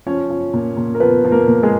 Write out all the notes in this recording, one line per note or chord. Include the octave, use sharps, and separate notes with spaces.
F3 C#4 C#5
F3
A#2
A#2
A#4
F3 B3 B4
F3
A#3 A#4
A#2
G#3 G#4